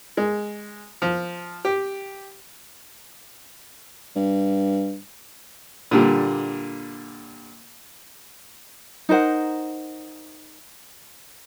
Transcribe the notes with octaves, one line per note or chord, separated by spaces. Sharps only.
G#3
F3
G4
G2
A#2 D3 G3
D#4 A#4 C5 F#5